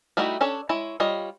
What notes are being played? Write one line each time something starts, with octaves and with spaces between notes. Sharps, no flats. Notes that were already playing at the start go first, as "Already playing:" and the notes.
G3 A3 D#4 E4 F#4
C#4 D4 A4 C#5
G#3 E4 C#5
G3 F4 C#5 D#5